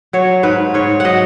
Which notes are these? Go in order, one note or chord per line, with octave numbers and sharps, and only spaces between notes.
F#3 C#5
G#2 B4
G#2 C#5
F#3 D#5 F#5